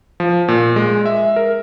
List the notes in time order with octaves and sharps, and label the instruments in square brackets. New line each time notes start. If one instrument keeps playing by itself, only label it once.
[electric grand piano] F3
A#2
G#3
E5
A#4